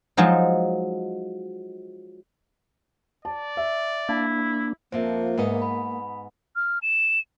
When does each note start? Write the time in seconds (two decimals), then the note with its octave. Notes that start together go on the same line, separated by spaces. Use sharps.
0.17 F3 F#3 G#3 D#4
3.25 D5 A5
3.57 E5
4.09 A#3 D4 E4
4.92 F2 F3 A#3 C5 E5
5.38 G#2 B3 D#5
5.62 B5
6.56 F6
6.82 E7